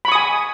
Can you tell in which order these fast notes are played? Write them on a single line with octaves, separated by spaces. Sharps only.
B5 C#6 D#6 G#5